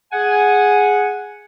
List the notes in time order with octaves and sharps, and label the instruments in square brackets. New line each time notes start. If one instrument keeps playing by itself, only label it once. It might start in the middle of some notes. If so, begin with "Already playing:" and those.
[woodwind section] G#4 F#5 G#5